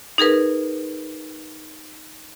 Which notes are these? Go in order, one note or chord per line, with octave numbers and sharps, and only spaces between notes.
D#4 G#4 A#4 B4